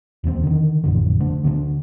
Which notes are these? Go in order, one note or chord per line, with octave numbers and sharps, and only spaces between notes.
E1 D#2 C#3 C4
D3 D#3
A1 F2 D3
D3 A3
D2 D3 A#3 D4